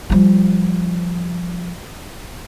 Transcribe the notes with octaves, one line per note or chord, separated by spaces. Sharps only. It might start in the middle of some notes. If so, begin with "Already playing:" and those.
F3 G3